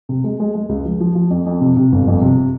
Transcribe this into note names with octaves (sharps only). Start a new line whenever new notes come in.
C3
G#3
G#3
G#3
C#2
F3
F3
F3
F2
F2
C3
C3
G1
F2
C3